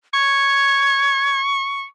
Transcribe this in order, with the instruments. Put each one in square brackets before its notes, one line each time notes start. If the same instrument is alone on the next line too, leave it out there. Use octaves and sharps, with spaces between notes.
[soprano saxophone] C#6 [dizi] G#6